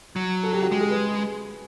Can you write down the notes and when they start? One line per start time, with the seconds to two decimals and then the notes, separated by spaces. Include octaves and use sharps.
0.16 F#3
0.43 A4
0.53 G4
0.62 F#4
0.72 G#3 G4
0.81 G#4
0.90 B4